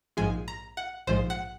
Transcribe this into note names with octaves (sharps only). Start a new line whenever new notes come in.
A#1 G#2 F3 G#3 G#5
A#5
F#5
A#1 G#2 F3 G#3 C5
F#5